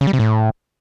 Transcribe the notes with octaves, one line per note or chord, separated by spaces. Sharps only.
C#3
G3
C3
A2